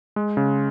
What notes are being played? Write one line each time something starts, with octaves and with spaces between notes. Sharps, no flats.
G#3
C#3